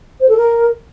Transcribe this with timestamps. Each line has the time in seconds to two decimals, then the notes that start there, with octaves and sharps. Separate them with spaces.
0.20 C5
0.29 A4
0.37 A#4